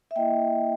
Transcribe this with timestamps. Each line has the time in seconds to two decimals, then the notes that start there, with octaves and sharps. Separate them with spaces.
0.11 E5
0.16 A#3 E4 D#5 G5